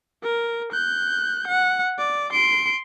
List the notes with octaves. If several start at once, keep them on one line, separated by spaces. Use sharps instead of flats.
A#4
F#6 G6
F#5
D5
C6 D7